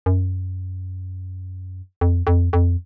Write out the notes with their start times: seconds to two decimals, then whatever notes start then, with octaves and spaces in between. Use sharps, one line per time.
0.06 F#2
2.01 F2
2.27 F2
2.53 F2